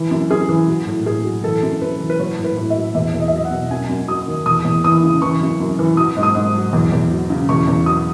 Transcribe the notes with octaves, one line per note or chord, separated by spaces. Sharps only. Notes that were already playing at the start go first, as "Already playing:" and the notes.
Already playing: E3
F#2
F#2 G#4
E3
F#3
A2
A2 G#4
F#3
E3 A4
F#2
F#2 B4
E3
B4
F#3 C#5
A2
B4
A2
E5
F#3
E2 E5
E2
D#5
E5
F#3 D#5
F#5
B2
F#2 G#5
F#2
F#3 D#6
D#3
E2 D#6
E2
E3 D#6
C#3
E3 C#6
F#2
F#2
E3
F#3 D#6
G#2
D#6
G#2
F#3
E2
E2
F#3
C#3
E2 C#6
E2
F#3 D#6